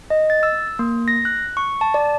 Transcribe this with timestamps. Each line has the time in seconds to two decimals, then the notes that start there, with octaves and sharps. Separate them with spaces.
0.10 D#5
0.30 A6
0.43 E6
0.79 A#3
1.08 A#6
1.25 F#6
1.57 C#6
1.81 A5
1.94 D5